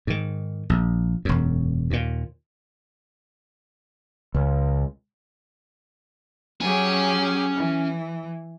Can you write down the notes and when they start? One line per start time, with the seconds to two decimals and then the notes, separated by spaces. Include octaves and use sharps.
0.07 G#2 D#3
0.70 A#1
1.25 E1 F#2
1.90 D#2 A#2
4.35 C#2
6.61 F#3 C#4 G4 G#4 G#5
7.55 E3